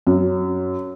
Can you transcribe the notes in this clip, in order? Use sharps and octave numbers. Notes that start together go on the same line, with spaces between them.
F#2